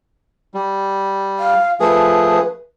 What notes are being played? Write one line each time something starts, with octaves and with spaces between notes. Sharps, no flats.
G3
F5
F3 A3 G#4 B4